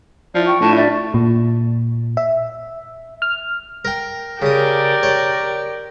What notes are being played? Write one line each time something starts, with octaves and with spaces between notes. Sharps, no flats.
F3 E4 D5
G5 C#6
A2 D4 E4 F4 A5
D5 E5
A#2
E5
F6
A#4 G5
C#3 G4 A#4 D5 D#6
C#5